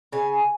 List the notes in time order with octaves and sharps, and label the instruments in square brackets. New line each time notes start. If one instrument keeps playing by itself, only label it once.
[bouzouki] C#3 G#5